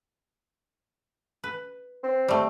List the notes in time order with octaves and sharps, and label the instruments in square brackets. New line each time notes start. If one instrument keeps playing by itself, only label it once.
[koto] B4
[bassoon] C4
[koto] G3 A3